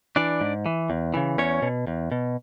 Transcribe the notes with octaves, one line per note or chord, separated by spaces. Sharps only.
E3 D4 D5
G#2
E3
E2
C#3 E3
E2 C#4 C#5
B2
E2
B2